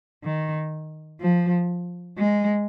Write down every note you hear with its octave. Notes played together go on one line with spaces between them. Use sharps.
D#3
F3
G#3